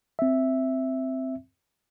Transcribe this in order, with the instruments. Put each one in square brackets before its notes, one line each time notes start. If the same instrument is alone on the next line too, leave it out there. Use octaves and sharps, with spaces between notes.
[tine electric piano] C4 E5